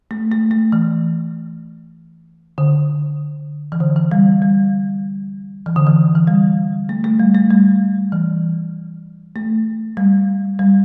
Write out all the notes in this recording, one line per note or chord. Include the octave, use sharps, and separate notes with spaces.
A3
A3
A3
E3
D3
E3
D3
E3
G3
G3
E3
D3
E3
E3
G3
A3
A3
G3
A3
G3
E3
A3
G3
G3